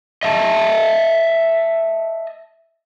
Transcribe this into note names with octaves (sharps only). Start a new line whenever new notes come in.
D#5 E5 A5